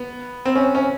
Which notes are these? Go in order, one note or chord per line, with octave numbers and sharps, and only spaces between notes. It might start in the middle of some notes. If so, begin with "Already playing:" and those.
Already playing: B3
C4
C#4
C#4